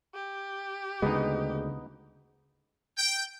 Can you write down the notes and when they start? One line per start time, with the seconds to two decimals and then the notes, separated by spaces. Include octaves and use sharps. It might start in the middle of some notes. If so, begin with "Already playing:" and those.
0.15 G4
1.02 D2 C#3 G#3 B3 D#4
2.98 G5